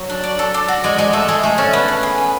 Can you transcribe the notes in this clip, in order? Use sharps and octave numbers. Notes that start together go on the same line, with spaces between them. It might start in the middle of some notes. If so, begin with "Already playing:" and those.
Already playing: F#3
D4
D5
A4
D4
F#4
G#3 D5
G#3 D5
A3 A4
G#3 G#4
A3 G#4
C#4 D4
B3 D4
G#4
G#4
B4